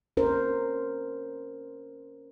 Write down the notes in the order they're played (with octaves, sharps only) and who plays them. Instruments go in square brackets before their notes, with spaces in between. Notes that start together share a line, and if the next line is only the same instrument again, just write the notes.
[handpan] C#4 A#4 C5